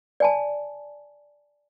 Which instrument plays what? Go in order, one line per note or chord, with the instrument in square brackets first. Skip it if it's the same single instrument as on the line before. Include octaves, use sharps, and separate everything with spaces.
[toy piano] D5 G#5 A5